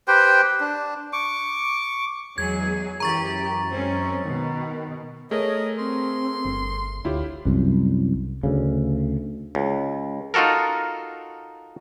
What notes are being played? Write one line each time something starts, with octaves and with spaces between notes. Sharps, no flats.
G4 B4 C5 G5
D4
C#6 D6
E2 F#3 G#3 G#4 G#6
F#2 E3 G4 A#5 C#6 A6
G#3 C4 C#4
B2 D#3
A3 G#4 A#4 C#5 D#5
C4 C6
G1
D2 E4 F4 G4 C#5
C2 F#2
D2 C#3
C#2
D#4 F4 F#4 A4 A#4